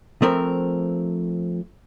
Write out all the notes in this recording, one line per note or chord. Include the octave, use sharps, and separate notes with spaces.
F3 A3 C4 A#4